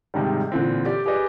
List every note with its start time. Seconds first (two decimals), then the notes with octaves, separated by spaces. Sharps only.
0.14 G#2 C3 D#3 G3
0.52 A#2 D3 E3 C4
0.86 G4 D5
1.06 G4 G#4 B4 D5 D#5